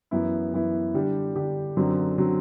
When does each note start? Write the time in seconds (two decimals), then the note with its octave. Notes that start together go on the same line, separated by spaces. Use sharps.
0.11 F#2 E3 B3 E4
0.53 F#2 E3 B3 E4
0.94 D3 G3 D4 G4
1.35 D3 G3 D4 G4
1.77 F#2 D3 F#3 C4
2.18 D3 F#3 C4